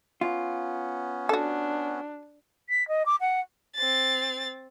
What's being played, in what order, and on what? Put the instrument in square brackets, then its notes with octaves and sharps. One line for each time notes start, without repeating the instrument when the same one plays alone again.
[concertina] B3 C#4 [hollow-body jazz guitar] F4
[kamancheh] D4 [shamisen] F#4 A4
[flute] B6
D#5
D6
F#5
[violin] C4 A6